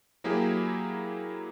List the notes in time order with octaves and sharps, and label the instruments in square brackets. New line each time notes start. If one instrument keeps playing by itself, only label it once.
[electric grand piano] F#3 A#3 E4 G4 G#4